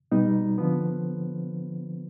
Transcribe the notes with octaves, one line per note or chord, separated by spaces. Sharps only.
B2 G3 B3 D#4
D3 F3 B3